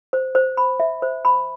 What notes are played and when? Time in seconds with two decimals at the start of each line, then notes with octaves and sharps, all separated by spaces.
0.13 C5
0.35 C5
0.57 B5
0.80 E5
1.02 C5
1.25 B5